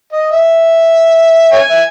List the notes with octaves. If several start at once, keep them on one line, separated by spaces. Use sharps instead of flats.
D#5
E5
C#5 E5 G#5
E5